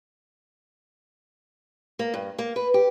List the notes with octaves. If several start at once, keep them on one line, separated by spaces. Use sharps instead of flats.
A#3
G2
A#3
B4
G4